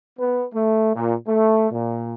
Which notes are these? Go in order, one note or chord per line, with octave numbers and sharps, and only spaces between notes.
B3
A3
A#2
A3
A#2